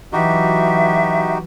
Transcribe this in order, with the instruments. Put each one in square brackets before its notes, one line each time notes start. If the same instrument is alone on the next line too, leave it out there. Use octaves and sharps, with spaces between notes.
[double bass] E3 F#3 [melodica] D#4 F#4 G4 [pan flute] E5